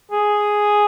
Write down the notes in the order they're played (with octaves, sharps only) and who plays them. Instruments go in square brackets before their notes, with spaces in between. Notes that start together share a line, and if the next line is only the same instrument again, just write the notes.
[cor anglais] G#4